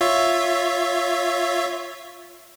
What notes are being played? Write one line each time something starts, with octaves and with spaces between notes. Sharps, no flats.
F4 C#5 E5